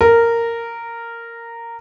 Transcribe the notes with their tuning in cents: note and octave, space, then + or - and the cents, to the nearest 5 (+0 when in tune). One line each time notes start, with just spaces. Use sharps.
A#4 -10